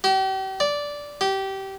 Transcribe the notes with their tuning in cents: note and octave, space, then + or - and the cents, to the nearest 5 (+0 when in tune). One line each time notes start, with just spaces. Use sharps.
G4 -40
D5 -10
G4 -20